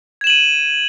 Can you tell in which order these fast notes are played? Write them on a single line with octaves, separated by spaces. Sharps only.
G#6 E7 F#7 D#7